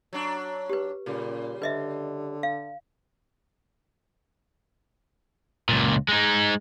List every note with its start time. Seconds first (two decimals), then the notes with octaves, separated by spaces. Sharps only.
0.13 F#3 D4
0.70 G4 B4
1.06 A#2 C#3 G3
1.62 D3 B4 D#5 E5
2.43 F5
5.69 C#2 A#2
6.08 G#3 D#4